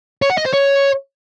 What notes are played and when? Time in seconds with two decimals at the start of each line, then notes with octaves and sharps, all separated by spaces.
0.22 C#5
0.30 F#5
0.38 D#5
0.46 C5
0.54 C#5